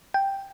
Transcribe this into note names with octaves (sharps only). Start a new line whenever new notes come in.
G5